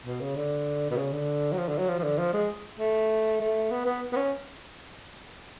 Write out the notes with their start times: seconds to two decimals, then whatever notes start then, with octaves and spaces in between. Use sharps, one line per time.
0.06 B2
0.21 C#3
0.36 D3
0.90 B2
0.97 C#3
1.12 D3
1.52 F#3
1.58 F3
1.68 D3
1.78 F#3
1.88 F3
1.99 F3
2.03 D3
2.19 F3
2.33 G#3
2.79 A3
3.41 A3
3.71 B3
3.86 B3
4.13 B3
4.16 C#4